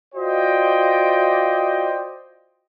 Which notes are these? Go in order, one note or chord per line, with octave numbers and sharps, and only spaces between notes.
F4 F#4 C5 D5 D#5 G5